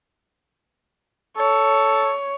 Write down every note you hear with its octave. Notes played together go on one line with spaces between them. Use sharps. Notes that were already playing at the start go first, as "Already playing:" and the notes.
A4 C#5